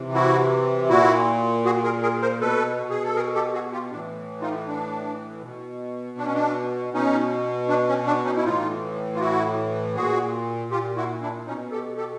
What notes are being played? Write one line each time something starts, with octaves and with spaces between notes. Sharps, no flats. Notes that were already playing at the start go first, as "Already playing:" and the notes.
Already playing: C3 E3
E4 F#4
A#2 E4 F#4
F#4 G#4
G#4 A#4
G#4 A#4
A#4 C5
B2 A4 B4
G#4
A4
G#4 A#4
G4 A4
F#4 G#4
F4 G4
A2 E3 D4
D#4 F4
D4
B2
D4
C#4
D4
B2 C#4 D#4
D4
C#4
D4
C#4 D#4
E4
A2 E3 D#4 F4
F4
E4 F#4
A#2 F#4 G#4
F4 G4
E4 F#4
D4 E4
B2 C#4 D#4
G4 A4
G4 A4